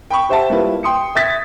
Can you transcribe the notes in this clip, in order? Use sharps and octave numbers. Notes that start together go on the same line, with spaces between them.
G5 B5 C#6
G4 C5 E5 F#5 A5
G3 A#3 E4 F4 B4
G5 C6 D#6 C#7
E5 D#6 G#6 A6 B6